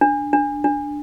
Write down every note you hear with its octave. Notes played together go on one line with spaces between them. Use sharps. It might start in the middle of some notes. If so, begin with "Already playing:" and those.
D4
D4
D4